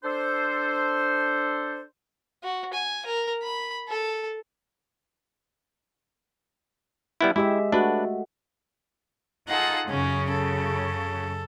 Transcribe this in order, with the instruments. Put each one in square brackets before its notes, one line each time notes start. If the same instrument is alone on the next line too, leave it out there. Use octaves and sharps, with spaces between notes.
[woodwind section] D4 A4 C5
[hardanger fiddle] F#4
G#5
A#4
B5
A4
[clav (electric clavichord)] G3 B3 E4
[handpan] G#3 G4 E5 [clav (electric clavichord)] E4
[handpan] A3 F#4 [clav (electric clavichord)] D4 B4
[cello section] D#4 F4 A4 [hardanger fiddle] G#4 F#5
[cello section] F#2 C#3 [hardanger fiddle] C#4
[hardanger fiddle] A4